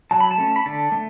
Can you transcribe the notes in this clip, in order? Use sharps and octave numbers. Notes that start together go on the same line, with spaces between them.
F#3 A5
B5
A5
A3 C#4
B5
D3 A5
A3